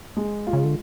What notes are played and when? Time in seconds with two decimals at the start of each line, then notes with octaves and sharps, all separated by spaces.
0.17 G#3
0.47 F4
0.53 C#3
0.65 D3